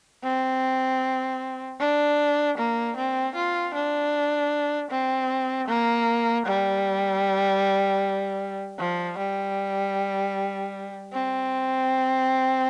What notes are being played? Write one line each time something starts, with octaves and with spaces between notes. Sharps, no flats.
C4
D4
A#3
C4
F4
D4
C4
A#3
G3
F3
G3
C4